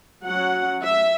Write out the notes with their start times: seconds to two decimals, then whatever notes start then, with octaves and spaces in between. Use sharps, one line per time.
0.24 F#3 C#4 F#5
0.84 E5